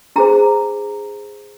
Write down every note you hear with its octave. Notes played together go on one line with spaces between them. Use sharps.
D4 G#4 C5 A#5